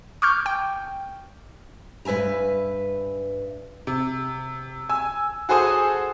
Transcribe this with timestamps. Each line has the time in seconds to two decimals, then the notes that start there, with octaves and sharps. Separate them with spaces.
0.22 C#6 D6 F6 G6
0.46 G5
2.05 G2 B4 E5 G#5 A#5
3.87 C3
4.89 G#5 E6
5.49 F#4 G#4 A4 C5 G#5 D#6